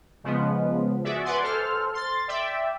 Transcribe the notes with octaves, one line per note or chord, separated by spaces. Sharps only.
C#3 F3 G#3 B3
F#4 G#4 D5 E5
B4 D5 F#5 G#5 C6
A4 C5 F6
C6 A6
D5 E5 G5